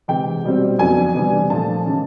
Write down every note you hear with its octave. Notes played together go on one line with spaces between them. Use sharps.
C3 E3 G#3 G5
B2 G3 C4
F2 C#3 F#3 B3 D4 G#5
C3 E3 G3 B3 D4
A#2 F3 A3 A5
C#3 E3 G#3 C#4